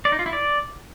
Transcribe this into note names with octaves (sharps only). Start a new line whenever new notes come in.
D5
D#4
F4
E4
D5